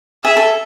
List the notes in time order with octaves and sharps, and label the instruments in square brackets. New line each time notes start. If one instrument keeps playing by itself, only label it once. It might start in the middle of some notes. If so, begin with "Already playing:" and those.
[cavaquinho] G#4 [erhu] E5
[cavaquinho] A4